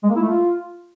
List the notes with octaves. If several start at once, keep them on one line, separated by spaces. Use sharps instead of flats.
G#3
A#3
E4
A3
F4